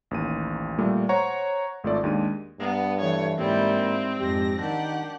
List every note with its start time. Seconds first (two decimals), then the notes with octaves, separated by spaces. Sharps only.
0.11 A1 D#2 D#7
0.78 A#2 G3 A3
1.09 C5 C#5 F#5 A#5 C#6
1.84 G#1 A3 F4 A4 D5
2.04 D#2 G#3 D4 D#7
2.59 G2 B3
3.00 E3 A3 C#5
3.38 G#2 G3 A#3 C4 E4
4.20 F2 G#2 G4 A#6
4.61 D#3 D4 G4 F#5